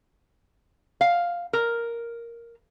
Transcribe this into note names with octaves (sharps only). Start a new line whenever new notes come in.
F5
A#4